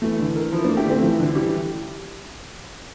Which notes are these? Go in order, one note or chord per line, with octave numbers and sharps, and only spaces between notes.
E3 A3
D3
A#4
F3 E4
A3 A#3 D4
E4 G4
D3 A3 C4
E3 F3
D3
E3 G3 G4